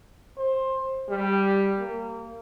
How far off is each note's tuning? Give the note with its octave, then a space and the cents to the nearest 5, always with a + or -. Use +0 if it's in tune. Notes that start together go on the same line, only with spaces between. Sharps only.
C5 +20
G3 +0
A#3 -25